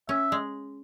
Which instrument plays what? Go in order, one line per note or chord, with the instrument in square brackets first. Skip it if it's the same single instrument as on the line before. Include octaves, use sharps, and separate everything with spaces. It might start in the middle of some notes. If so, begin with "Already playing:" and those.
[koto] C#4 [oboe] E5
[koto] G#3